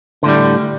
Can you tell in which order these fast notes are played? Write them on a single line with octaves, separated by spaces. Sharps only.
D3 A2 G3